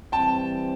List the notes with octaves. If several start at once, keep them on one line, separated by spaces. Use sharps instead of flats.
E3 G3 C4 G5 A5